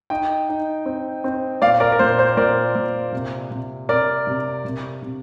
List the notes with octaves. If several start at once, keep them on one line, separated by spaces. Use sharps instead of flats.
D#4 D#5 G5
D#4
C4
C4
A#2 D5 F5
A#4 D5
A#4
A#2 C5
C5
A#2 A#4 D5
A#2
C3
C3
C3 A#4 D5
C3
C3
C3